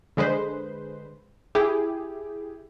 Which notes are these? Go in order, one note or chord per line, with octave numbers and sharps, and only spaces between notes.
D3 G#3 B4 C5
E4 G4 G#4